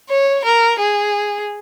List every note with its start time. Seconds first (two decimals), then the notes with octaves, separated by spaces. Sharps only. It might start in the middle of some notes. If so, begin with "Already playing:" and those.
0.09 C#5
0.44 A#4
0.79 G#4